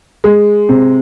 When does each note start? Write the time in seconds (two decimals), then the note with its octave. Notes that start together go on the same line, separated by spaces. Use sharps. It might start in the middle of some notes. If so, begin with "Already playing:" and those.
0.24 G#3
0.69 C3